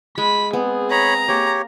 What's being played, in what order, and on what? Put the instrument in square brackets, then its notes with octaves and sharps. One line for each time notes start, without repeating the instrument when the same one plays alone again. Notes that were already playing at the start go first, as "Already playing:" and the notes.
[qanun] G#3 [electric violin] B5 B6
[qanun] B3 [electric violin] C4 G#4
[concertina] C#5 B5 [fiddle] A#5
[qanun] A#3 [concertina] G4 C#5